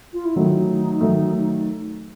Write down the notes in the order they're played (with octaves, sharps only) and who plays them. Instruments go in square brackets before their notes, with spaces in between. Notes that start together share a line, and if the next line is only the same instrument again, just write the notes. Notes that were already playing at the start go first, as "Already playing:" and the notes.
[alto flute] F4
E4
[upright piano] D#3 F#3 A3 [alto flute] D#4
[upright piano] D#3 F#3 A3